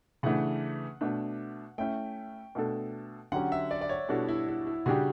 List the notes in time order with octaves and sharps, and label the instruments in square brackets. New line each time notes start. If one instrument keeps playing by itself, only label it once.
[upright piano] C#3 E3 A3 D4 [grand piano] F#5
[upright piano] B2 A3 D4
[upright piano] A3 C#4 E4 [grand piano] G5
[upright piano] B2 A3 D4 A4
[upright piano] D3 F#3 C#4 G4 [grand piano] F#5
[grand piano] E5
D5
D5
C#5
[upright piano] B2 G3 D4 F#4 A4 [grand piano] E4
[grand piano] E4
E4
E4
[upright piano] C#3 G3 D4 G4 [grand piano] F#4